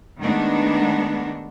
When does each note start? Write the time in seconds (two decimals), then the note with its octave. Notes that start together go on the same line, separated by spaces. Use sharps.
0.21 D#3 G#3 A3 B3 D4 D#4